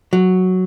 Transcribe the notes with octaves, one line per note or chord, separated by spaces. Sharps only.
F#3